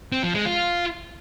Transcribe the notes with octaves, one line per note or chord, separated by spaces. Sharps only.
C4
F3
G#3
F4